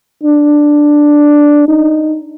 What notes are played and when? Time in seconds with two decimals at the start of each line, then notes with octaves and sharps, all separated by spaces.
0.23 D4
1.68 D#4